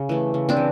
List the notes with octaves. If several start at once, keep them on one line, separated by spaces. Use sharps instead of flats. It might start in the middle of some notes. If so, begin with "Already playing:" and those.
Already playing: C#3
E3 A3
C#3
C4 D4
E3